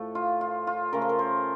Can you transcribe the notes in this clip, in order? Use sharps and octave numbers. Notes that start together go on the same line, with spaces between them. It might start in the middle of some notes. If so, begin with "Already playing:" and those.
Already playing: A2 F3 A3 A4
F4
F4
F4
C#3 A3 A#4
C5
A#4
C5